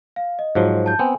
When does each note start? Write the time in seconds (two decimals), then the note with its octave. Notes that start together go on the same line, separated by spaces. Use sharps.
0.16 F5
0.39 D#5
0.55 G#2 F3 F#3
0.86 A5 G6
0.99 B3 C4 G#5